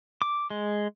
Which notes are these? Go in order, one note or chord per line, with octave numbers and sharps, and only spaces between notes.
D6
G#3